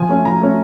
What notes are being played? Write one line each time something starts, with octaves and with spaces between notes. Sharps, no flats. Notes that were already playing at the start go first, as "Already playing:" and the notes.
Already playing: F3 G#5
A3 C#4
F3 A#5
A3 C#4